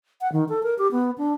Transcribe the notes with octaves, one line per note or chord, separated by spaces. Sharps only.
F#5
D#3
A4
A#4
G4
B3
D4